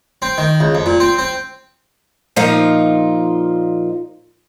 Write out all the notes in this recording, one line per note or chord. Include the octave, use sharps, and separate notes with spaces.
C4
D#3
C#2
F2
A#2
C4
C4
A#2 F3 D#4 F4